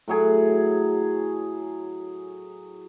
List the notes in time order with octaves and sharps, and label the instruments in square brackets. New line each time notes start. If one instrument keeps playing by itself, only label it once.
[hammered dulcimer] A2 F#3 G#4